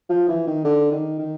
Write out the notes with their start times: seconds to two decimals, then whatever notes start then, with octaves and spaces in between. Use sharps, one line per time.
0.09 F3
0.29 E3
0.47 D#3
0.64 D3
0.92 D#3
1.19 D#3